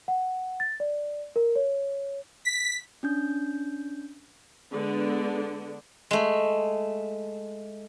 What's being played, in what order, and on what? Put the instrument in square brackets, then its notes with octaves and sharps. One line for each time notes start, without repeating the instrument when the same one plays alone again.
[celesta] F#5
A6
D5
A#4
C#5
[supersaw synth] B6
[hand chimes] C#4 D4 G6
[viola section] D3 G#3 B3 D4
[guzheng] G#3 A3